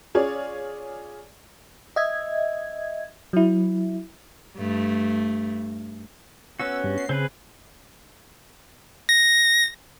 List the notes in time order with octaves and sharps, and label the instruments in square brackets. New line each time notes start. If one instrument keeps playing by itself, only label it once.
[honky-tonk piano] C#4 F4 G#4 C#5 D5
[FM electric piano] D#5 E5 G#6
F#3 E4
[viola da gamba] G2 A3
[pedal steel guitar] B3 C#4 F#4 [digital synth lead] E6
[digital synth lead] G2
C7
[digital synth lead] C#3 [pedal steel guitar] C4 G#4 B4
[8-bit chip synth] A#6